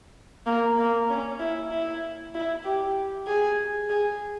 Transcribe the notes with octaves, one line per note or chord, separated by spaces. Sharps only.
A#3
A#3
C#4
E4
E4
E4
G4
G#4
G#4